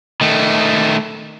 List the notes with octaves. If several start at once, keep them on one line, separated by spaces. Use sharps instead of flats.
D#3 A3